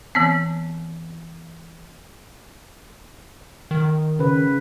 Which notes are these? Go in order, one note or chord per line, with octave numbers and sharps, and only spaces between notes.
E3 B3 C4
D#3
C#3 B4